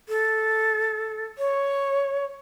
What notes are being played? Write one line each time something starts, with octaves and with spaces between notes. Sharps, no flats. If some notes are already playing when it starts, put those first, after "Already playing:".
A4
C#5